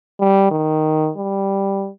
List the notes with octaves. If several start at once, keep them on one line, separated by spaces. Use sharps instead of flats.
G3
D#3
G3